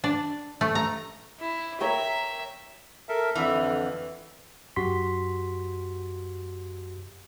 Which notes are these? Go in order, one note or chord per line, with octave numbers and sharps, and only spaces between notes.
D4
A3
A#5
E4
A#4 C#5 E5 G5
A4 A#4 E5
F2 D3 E3
F#2 F#4 G4 C6 B6